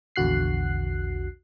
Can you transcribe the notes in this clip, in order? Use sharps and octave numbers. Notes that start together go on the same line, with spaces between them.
A#1 E2 D3 F#4 F#6 C7